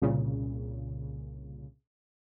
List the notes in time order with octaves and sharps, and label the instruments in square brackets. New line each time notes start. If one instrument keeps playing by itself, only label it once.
[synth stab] C2 A#2 C#3